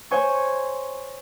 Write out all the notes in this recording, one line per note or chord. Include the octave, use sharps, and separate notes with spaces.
C5 C#5 G#5 C#6